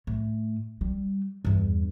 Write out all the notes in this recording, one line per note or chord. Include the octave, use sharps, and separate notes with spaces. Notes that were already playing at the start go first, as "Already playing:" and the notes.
A2
G3
E2 G2